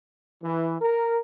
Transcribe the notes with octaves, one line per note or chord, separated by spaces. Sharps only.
E3
A#4